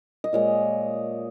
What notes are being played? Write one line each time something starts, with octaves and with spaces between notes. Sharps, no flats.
D#5
A#2 G#3 C#5